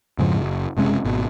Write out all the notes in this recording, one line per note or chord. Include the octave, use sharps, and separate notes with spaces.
F2 G#2 C#3 F3
F#1
F#1 C3 G#3 C#4
G#1 B2